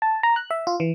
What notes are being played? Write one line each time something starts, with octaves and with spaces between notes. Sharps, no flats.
A5
A#5
F#6
E5
F4
E3